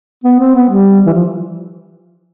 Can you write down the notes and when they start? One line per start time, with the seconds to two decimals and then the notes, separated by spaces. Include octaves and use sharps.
0.24 B3
0.39 C4
0.55 B3
0.69 G3
1.06 E3
1.14 F3